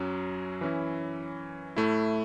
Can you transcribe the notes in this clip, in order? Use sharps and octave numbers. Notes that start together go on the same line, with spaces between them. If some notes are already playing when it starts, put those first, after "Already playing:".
Already playing: F#2 F#3 C#4 F#4
E3 C#4 E4
A2 A3 E4